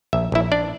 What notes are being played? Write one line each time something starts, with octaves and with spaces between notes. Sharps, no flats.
A#1 E5
A#1 E4 E5
D4 D5